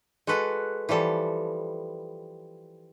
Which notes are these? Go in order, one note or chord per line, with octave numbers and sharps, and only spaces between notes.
G#3 F#4 A4 B4
E3 F3 G3 A4